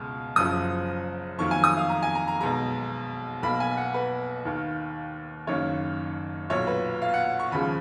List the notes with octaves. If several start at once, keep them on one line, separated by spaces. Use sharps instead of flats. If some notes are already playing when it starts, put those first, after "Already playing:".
Already playing: C#2 B2 G#3 F6
F#1 F#2 F3 D#6
F2 D#3 F#3 A#3 C#6
G#5
D#6
F5
A#5
G#5
A#5
A#5
B1 B2 G#3 A#5
B1 B2 A#3 B5
G#5
F#5
B4
D#2 D#3 A#3
F#1 F#2 D#3 A#3 C#5
B1 A#2 F#3 C#5
B4
F5
F#5
C#6
D#2 C#3 F3 G#3 B5